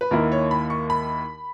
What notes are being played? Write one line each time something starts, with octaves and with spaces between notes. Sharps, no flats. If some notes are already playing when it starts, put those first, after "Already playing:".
B4
D#2 D#3 A#3 E4 A#4
C#5
B5
C#6
B5